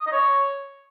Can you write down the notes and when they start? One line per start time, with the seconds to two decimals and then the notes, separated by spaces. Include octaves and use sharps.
0.01 D#6
0.07 D#5
0.12 C#5